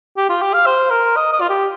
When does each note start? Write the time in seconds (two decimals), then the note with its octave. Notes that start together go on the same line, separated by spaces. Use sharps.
0.17 G4
0.29 F4
0.42 G4
0.53 F5
0.66 C5
0.91 A#4
1.16 D#5
1.33 D#5
1.41 F4
1.49 G4